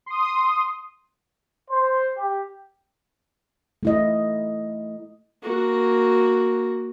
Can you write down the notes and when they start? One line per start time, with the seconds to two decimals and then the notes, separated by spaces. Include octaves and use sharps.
0.06 C6 D#6
1.69 C5
2.17 G4
3.83 A3 E4 D#5
5.43 A#3 F#4